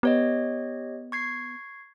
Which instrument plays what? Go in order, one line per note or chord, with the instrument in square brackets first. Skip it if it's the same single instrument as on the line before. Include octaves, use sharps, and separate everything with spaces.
[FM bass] B3 [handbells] G4 C#5 D#5
[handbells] C#6 G#6 C7